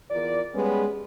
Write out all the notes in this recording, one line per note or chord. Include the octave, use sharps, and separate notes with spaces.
E2 F4 A#4 D5
G3 G#3 B3 C#4 B4